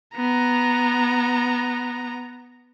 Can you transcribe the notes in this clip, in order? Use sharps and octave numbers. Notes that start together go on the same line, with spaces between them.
B3 A#5